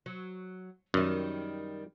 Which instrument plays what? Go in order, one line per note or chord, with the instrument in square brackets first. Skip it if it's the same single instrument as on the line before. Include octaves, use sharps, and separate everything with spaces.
[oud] F#3
[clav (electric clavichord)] F#2 [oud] D#3 G3